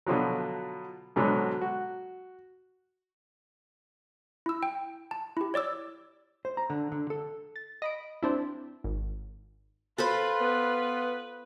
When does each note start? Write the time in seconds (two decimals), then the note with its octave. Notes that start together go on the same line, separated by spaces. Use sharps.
0.07 B2 D3 F3 F#3
1.16 G#2 B2 D3 F#3
1.61 F#4
4.46 E4 E6
4.63 G5
5.11 A5
5.37 E4 G4
5.54 C#5 D5 D6 E6
6.45 C5
6.57 A#5
6.70 D3
6.92 D3
7.10 A4
7.56 A6
7.82 D#5 B5 D7
8.23 C4 D4 E4
8.84 G#1
9.98 F4 A4 B4 C5 B5
10.41 B3